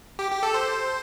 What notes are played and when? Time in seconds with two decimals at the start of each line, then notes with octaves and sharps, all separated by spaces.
0.19 G4
0.32 G4
0.43 A4
0.54 C5